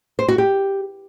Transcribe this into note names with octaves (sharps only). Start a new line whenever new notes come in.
C5
F#4
G4